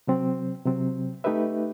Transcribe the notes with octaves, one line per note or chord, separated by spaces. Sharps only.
C3 F#3 C4
C3 F#3 C4
A3 D#4 G4 B4 E5